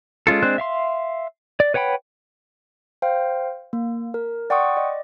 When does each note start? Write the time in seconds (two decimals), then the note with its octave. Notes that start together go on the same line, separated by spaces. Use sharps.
0.27 G#3 C#4 F4 A4
0.42 G#3 C4 D4 C5 F#6
0.58 E5 F5 C6
1.60 D5
1.74 B4 C#5 F#5 G5 B5
3.02 C5 F5 G5
3.73 A#3
4.14 A#4
4.50 D5 F#5 G5 C6 C#6 D#6
4.77 D5 D#5